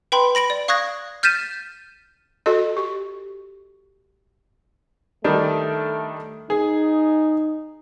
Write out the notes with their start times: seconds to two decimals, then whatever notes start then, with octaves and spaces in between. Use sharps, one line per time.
0.12 B4 G5 B5 C6
0.35 B5 A#6 D7 F#7
0.50 D5
0.68 F5 C#6 D#6 F#6 G#6 A#6
1.23 F6 G6 A6 B6 D#7 E7
2.46 F#4 A4 D#5
2.77 G4
5.24 D#3 G3 A3 D4
6.50 D#4 G#4